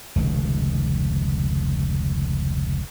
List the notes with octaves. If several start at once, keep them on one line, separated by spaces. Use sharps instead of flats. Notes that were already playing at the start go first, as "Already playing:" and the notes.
F1 C#2 B2 D#3